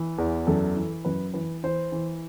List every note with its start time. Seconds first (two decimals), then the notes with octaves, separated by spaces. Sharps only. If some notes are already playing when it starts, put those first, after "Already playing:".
Already playing: E3
0.18 E2
0.47 F#2 A4
0.76 E3
1.05 F#2 B4
1.34 E3 B4
1.63 E3 C5
1.92 E3